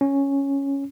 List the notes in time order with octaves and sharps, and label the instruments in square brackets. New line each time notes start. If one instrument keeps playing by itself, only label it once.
[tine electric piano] C#4